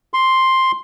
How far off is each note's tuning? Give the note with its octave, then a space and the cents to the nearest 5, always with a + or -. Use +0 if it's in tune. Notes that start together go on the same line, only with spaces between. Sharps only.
C6 +5